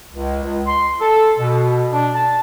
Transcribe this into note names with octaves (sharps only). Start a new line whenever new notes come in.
C#2
C#2
C6
A4
B2
D4
A5